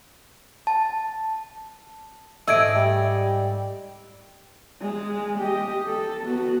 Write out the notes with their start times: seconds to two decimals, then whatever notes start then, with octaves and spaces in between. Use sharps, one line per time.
0.67 A5
2.48 G#2 A3 D5 D#5 E6 G#6 D7
2.75 G3
4.81 G#3
5.39 G4 D#5
5.87 A4
6.24 B3 F#4